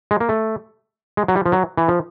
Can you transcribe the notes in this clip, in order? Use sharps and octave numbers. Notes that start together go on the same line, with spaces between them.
G#3
A#3
A3
G#3
F#3
G3
F3
F#3
E3
F3